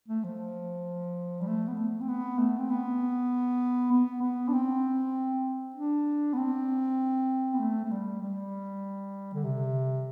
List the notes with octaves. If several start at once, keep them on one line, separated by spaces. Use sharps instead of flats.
A3
F3
G3
A3
B3
A3
C4
B3
A3
C4
B3
B3
B3
D4
C4
D4
B3
C4
B3
A3
A3
G3
G3
D3
C3